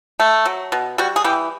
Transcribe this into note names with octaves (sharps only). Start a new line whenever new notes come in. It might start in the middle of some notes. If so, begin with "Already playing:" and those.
A3
F#3
B2
G3 F#4
G#4
E3 G4